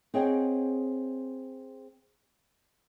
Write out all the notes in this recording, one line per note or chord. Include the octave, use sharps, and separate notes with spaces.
C4 G#4 C#5 D#5 F#5 G5